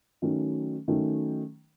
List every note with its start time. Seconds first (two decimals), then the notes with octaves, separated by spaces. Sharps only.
0.22 D#3 F#3 A3 C#4
0.88 D#3 F#3 A3 C#4